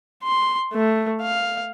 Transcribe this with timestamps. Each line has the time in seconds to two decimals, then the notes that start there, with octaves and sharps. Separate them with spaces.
0.24 C6
0.73 A3
1.21 F5